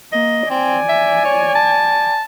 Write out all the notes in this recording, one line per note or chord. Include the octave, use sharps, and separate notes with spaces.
A#3 D#5
C4 D5 G#5
E5
C#5
A5